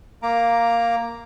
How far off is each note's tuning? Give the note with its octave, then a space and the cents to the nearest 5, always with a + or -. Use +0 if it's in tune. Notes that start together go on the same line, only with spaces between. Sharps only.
A#3 +0 A#5 +0 D6 +0